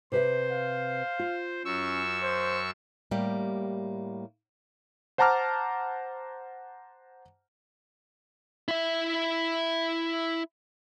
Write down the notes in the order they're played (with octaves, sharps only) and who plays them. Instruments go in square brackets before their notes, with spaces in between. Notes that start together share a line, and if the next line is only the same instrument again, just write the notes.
[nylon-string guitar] C3 B4 E5 [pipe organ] C5
[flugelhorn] F5
[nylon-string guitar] F4
[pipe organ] F#2 C#6 E6 [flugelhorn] C#4
[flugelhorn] C5
[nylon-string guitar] A2 G3 A#3 G4
[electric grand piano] C5 F#5 A5 A#5 D6 F6
[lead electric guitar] E4 E5